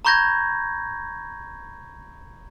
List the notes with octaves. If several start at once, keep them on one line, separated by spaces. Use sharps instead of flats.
A#5 B5 C#6 G6 G#6 A#6